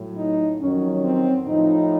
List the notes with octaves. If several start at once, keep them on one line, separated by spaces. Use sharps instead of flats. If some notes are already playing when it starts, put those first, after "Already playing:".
Already playing: A2 F#3
D#4
F2 D#3 F#3 C#4
C4
A2 F3 D#4